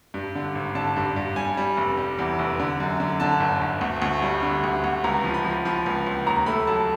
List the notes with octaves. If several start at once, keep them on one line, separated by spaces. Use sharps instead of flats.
G2
D3
G#1
D3 A5
G2
G2
G3 G#5
G3
F1
G3
E2
F1
D3
F#2
D3
D3 A5
G1
G1
D2
D2
G3
D3
D2
D2
C#2 A#5
F3
B5
F3
F3 B5
C#2
C#2
D#2 A#5
A3 B5
F#3 A5